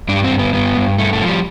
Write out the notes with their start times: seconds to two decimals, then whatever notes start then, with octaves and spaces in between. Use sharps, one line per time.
0.08 G2 D4
0.24 C4
0.31 G2
0.39 B3
0.53 G2 B3
0.77 G2
0.98 G2 A3
1.13 A3
1.22 F3
1.28 G3